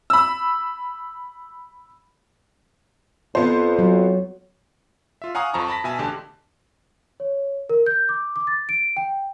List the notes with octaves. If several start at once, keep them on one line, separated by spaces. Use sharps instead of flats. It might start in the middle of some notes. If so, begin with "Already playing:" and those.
B5 E6
F2 B3 C5
F#3
F4 E5
F5 F#5 G#5 A#5 C#6 D#6
F2 C5 A5 A#5 C#6 D#6
A5 B5 A#6 B6
B2 E5 G#5 A5
A1 D3 G4 A5
C#5
A#4
G6
D6
D6
A6
D7
G5